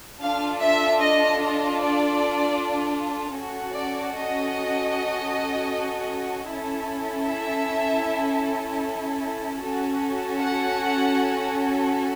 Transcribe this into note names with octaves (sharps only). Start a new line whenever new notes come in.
D4 F4 A4 F5
E5
D#5
D#5
D5
C#4 F#4 A4
D5
D#5
C#4 E4 A4
E5
C#4 F#4 A4
F#5